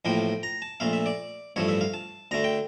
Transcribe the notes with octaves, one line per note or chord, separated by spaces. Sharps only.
A1 A2 F3 A#3 G5
A#5
A5
A#1 A#2 A3 F5
E5
D5
A1 G2 F3 A3 C#5
E5
F5
A5
D2 D3 A3 A#5
G5